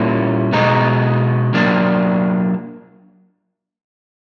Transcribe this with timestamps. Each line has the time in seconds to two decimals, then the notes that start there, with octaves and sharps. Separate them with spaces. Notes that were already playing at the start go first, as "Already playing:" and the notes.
Already playing: A#2 G3 A#3 C#4 E4
0.53 B2 G#3 B3 D#4
1.54 F#3 A#3 D4